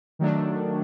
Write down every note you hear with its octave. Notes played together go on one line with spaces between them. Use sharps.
D#3 F#3 A3 D4